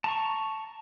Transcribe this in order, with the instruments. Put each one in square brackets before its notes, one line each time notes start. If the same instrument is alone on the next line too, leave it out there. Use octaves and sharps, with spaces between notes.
[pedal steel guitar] A5 A#5 C#6